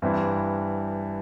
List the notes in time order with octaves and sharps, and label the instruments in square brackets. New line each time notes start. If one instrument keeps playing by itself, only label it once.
[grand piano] G2 E3 C4 E4